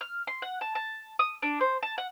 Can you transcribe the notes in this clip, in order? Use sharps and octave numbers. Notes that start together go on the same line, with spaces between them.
F6
C6
F#5
A5
A5
D#6
D4
C5
A5
F#5